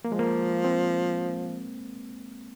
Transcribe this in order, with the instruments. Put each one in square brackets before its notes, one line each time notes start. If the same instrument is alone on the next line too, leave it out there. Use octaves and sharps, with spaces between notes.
[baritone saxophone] F3 [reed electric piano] A#3
[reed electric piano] G#3
A#3
C4